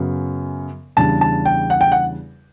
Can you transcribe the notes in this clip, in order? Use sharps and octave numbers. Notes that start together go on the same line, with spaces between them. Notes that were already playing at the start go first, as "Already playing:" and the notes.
Already playing: F#2 C#3 F#3 B3
E2 C#3 G3 D4 A5
A5
G5
F#5
G5
F#5